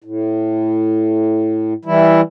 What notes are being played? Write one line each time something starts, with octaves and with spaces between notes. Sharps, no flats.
A2
E3 G3 E4